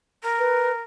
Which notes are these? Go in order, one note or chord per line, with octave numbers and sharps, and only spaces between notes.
A#4
B4